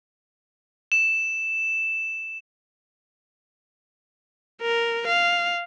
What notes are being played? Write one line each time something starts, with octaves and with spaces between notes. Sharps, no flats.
E7
A#4
F5